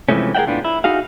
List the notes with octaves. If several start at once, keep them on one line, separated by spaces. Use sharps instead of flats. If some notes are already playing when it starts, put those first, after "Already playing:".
C3 E3 F3 G#3 A3 C#4
G#4 A#4 D5 E5 F#5 G5
A2 B3 D4 F4
E4
D#4 F#4 G#4 F5